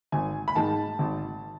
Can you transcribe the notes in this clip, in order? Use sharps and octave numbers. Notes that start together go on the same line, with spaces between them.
G#1 G#5
B5
G#2 D#3 A5
G#1